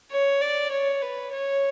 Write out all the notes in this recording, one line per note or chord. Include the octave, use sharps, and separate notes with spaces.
C#5
D5
C#5
B4
C#5